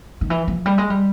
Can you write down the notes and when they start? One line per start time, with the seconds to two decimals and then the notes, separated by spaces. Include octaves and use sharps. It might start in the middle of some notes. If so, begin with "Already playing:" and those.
0.21 D#3
0.30 E3
0.48 F3
0.66 G3
0.78 G#3
0.90 G3